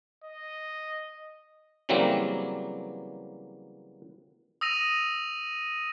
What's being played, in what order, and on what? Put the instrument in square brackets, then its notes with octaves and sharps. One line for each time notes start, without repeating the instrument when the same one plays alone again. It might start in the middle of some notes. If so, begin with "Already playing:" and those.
[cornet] D#5
[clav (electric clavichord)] C#3 E3 F#3 G3 A#3 C4
[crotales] D#6 E6 A#6 D#7 F7